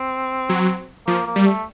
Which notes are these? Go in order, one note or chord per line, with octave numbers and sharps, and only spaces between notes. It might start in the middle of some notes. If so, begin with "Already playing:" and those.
Already playing: C4
F#3
F3 A#3
A#3
G3
A3